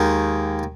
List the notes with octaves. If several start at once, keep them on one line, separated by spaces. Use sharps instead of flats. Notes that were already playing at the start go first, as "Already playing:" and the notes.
Already playing: D#2 D#3 G#3